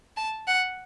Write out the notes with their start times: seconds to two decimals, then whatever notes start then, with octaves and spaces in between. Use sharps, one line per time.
0.17 A5
0.48 F#5